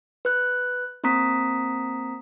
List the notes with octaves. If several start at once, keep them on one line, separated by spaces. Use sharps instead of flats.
B4 F#6
A#3 C4 A#5 D#6 B6